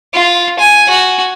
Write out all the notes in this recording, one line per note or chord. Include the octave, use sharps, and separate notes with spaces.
F4
G#5
F#4